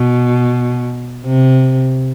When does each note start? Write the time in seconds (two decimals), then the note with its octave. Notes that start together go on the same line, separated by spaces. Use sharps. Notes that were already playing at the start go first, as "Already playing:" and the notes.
Already playing: B2
1.25 C3